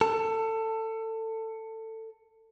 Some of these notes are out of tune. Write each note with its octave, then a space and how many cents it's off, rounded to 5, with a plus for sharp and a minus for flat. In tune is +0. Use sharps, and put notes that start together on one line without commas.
A4 +20